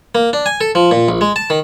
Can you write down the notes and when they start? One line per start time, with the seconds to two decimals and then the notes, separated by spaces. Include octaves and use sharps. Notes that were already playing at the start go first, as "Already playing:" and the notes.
0.15 A#3
0.33 D4
0.46 G#5
0.61 A4
0.75 F3
0.91 A#2
1.08 A#1
1.21 G#3
1.36 A5
1.50 D#3